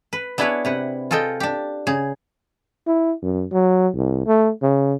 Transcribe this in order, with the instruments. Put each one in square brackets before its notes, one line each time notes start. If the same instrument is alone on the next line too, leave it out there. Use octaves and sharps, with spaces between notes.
[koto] B4
B3 D4 E4 G#4 B4 C#5
C3 B4 F#5
F4 G#4 A4 D#5 G5
D4 G4
C#3 G#4
[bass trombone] E4
F#2
F#3
C2
A3
C#3